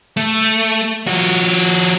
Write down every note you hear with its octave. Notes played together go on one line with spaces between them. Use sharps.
A3
F3 F#4